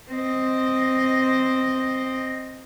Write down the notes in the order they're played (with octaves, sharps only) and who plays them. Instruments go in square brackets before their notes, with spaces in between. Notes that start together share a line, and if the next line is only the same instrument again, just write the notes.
[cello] C4 D#5